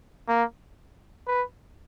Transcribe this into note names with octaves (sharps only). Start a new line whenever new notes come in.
A#3
B4